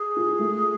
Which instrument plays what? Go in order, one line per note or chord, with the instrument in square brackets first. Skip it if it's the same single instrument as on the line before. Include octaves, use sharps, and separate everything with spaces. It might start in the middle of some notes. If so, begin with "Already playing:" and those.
Already playing: [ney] G#4
[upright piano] F4
A3